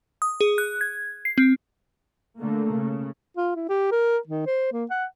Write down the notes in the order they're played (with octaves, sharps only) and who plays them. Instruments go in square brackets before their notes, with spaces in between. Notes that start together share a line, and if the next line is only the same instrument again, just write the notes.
[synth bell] D#6
G#4
F#6
G#6
C7
C4
[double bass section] D3 A3 A#3
C#3
[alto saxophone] F4
E4
G4
A#4
D#3
C5
A#3
F#5